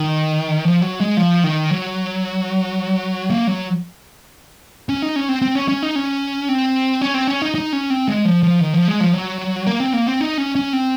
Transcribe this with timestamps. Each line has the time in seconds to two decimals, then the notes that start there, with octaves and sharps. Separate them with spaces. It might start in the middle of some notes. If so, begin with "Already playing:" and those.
Already playing: D#3
0.65 F3
0.82 F#3
1.00 G#3
1.17 F3
1.44 D#3
1.71 F#3
3.30 A#3
3.47 F#3
4.89 C#4
5.02 D#4
5.16 C#4
5.29 C4
5.42 C4
5.55 C#4
5.69 C#4
5.82 D#4
5.95 C#4
6.49 C4
7.01 C#4
7.14 C4
7.27 C#4
7.42 D#4
7.55 D#4
7.73 C#4
7.90 C4
8.08 G#3
8.25 F3
8.43 F3
8.61 D#3
8.74 F3
8.88 G#3
9.00 F3
9.13 F#3
9.67 A#3
9.80 C4
9.94 A#3
10.07 C4
10.20 D#4
10.38 C#4
10.55 C#4
10.73 C4